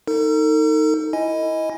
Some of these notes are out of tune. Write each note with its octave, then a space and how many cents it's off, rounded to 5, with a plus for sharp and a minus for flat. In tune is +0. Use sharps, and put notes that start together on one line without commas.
D#4 +10 A4 +40
E4 +0 D#5 +15 G#5 -5